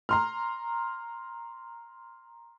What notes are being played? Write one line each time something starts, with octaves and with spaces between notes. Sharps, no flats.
A#5 C6 F6